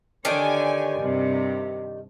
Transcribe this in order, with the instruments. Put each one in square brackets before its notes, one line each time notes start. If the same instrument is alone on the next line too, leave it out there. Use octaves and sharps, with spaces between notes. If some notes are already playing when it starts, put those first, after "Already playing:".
[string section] D3 C#5 G#5 [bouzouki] D#3 D4 G4
[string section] G2 C3